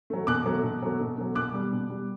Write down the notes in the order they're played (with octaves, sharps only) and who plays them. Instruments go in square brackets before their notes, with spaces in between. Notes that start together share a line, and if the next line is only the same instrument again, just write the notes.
[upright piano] F#3 A3
B2 D6 F#6
F#3 A3
B2
F#3 A3
B2
F#3 A3
B2 D6 F#6
G3
B2
G3